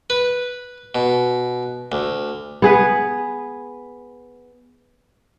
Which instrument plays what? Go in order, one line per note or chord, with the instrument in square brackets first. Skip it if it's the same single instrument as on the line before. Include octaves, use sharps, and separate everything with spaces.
[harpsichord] B4
B2
D2
[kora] B3 G#4 B4